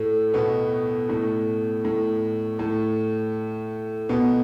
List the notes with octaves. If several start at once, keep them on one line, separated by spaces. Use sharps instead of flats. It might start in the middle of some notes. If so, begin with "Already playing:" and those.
Already playing: A2 A3
B2 B3
A2 A3
A2 A3
A2 A3
B2 B3